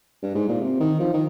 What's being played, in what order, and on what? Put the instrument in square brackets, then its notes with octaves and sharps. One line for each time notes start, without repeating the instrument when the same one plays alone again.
[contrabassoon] G2
G#2
A#2
C3
D#3
F3
D#3